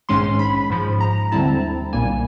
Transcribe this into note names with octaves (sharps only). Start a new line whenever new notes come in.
A#1 G#2 D#3 G#3 C#4 C6
B5
G#2 F3 G#3
A#5
D#2 D3 G3 C4 E4 A5
B1 A#2 G3 A#3 G#5